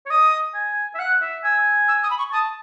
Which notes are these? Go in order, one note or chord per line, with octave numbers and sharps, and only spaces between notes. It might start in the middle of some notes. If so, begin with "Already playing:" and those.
C#5
D#5 D#6
G#5
E5
F#5 F#6
E5
G#5 E6
E6
D#6
B5
C#6
A5 D#6